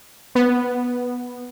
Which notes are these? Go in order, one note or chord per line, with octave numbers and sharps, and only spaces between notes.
B3